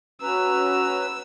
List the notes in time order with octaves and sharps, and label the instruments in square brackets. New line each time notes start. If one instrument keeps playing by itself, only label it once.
[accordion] C#4 B4 [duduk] F#4 [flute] A#5 [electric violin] E6